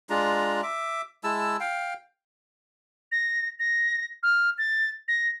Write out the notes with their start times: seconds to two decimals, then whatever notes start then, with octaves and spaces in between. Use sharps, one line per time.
0.10 G#3 D4 F4 A#5
0.63 E5 D6
1.24 G#3 E4 A5 E6
1.60 F5 G5
3.12 A#6
3.59 A#6
4.23 F6
4.58 A6
5.08 A#6